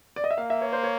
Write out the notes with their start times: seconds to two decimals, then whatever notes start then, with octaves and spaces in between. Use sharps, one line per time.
0.16 D5
0.24 D#5
0.31 E5
0.38 A#3 F5
0.50 E5
0.61 C#5
0.73 C5
0.84 C#5